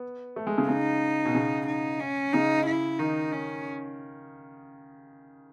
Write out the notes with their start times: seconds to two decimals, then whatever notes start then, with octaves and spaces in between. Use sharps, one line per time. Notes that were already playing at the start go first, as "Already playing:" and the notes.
Already playing: B3
0.36 A3
0.47 G#3
0.58 C#3
0.69 C#3 D#4
1.25 B2
1.35 C#3
1.67 D#4
2.00 C#4
2.33 C#3 D#4
2.66 E4
2.99 D#3 D#4
3.32 C#4